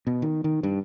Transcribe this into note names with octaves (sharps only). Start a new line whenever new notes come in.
B2
D#3
D#3
G2